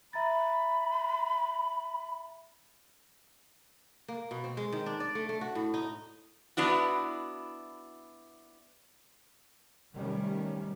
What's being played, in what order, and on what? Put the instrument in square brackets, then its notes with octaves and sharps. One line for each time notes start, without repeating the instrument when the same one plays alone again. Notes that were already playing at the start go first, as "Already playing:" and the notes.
[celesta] E5 A#5 A6 [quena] B5
[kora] A#3
B2
C4
G#3
D#3
D4
D5
A3
A3
F#4
A2
D#4
[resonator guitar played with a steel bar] B3 D4 E4 F#4
[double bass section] C3 D#3 G3 A3 C#4